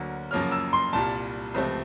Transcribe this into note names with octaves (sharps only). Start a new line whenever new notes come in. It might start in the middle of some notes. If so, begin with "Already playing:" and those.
Already playing: D2 D3 F#3 A#3
F#2 C#3 F3 A#3 C#4 F6
E6
C6
C2 A#2 G3 A5
C#2 C3 F3 A3 C4